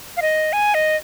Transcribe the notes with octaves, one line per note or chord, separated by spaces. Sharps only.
F5
D#5
G#5
D#5